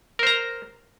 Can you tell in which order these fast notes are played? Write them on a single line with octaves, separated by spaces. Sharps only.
A#4 C5 A#5